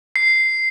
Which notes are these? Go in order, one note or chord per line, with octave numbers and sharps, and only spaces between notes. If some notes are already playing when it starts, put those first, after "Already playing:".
C7